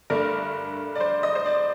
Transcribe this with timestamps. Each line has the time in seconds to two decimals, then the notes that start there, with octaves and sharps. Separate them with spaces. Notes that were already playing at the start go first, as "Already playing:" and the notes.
0.10 G2 D3 A3 A#4
0.95 D5
1.00 C5
1.23 D#5
1.35 C5
1.46 D5